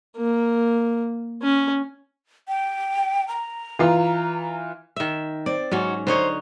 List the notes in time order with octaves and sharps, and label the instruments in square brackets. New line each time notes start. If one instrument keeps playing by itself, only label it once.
[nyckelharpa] A#3
C#4
[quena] G5
A#5
[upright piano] E3 F4
[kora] D#3 E5
[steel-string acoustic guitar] C4 [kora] D5
[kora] G#2 F#3 C#4 [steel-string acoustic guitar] D#4 F#4
[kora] D3 D#4 C#5 [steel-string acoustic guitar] C5